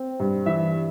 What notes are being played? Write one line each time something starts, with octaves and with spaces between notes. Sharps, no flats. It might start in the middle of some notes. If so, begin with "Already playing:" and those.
Already playing: C4
G2
E3 E5